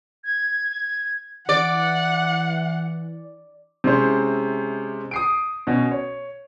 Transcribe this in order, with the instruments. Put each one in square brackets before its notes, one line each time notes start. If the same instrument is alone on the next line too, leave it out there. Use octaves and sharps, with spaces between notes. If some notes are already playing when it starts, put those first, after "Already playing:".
[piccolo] G#6
[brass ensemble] E3 [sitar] D5 [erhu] F#5
[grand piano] C3 G#3 C#4 E4 C5
D#6 C7 D7
B2 C#4
C#5